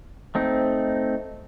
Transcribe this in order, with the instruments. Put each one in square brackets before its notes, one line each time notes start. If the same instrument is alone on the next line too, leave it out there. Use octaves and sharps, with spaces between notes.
[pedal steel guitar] A3 C4 D#4